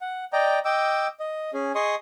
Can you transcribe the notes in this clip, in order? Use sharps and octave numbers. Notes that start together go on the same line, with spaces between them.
F#5
D5 D#5 G5 A#5
D#5 G5 D6 E6
D#5
C#4 G#4
G#4 D#5 C6 C#6 D#6